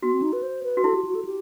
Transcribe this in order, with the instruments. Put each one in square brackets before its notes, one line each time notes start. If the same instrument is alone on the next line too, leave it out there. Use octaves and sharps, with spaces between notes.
[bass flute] B3 [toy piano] F#4
[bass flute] C4
D#4
B4
C5
B4
[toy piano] F#4
[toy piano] E4 [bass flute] A4
[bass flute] G4
F#4
A4
G4